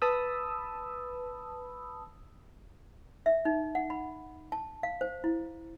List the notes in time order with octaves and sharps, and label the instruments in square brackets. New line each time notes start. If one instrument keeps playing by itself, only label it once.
[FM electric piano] B4 A5 B5 D#6 E6
[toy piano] E5
D#4
F#5
B5
A5
F5
C5
E4